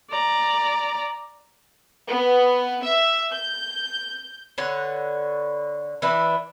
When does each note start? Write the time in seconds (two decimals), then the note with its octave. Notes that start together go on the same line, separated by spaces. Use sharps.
0.11 D5 A#5
2.07 B3
2.82 E5
3.32 G6
4.58 D3 B4 C#5 F#5
6.02 E3 D4 E4 B4